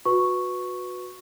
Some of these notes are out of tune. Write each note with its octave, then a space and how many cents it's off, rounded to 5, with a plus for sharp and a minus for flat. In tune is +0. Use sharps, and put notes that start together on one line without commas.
F#4 -25 B4 +0 C#6 +0